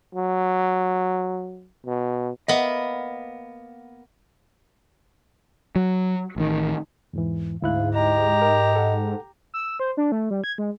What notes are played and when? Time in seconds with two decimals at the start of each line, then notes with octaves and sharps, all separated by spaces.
0.15 F#3
1.86 B2
2.48 A#3 B3 D#5 E5
5.76 F#3
6.36 A1 D#3
7.13 E2 G#2 E3
7.62 D2 G#2 E4 F5 F#6
7.94 G4 D#5 A#5
8.42 A#4
8.76 A4 F#5
9.54 E6
9.80 C5
9.97 D4
10.12 A3
10.31 G3
10.44 G#6
10.58 G#3